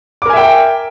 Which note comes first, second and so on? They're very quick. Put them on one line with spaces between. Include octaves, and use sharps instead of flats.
D6 A#4 G#5 E5 G5